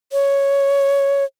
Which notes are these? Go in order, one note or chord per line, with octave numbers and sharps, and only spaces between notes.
C#5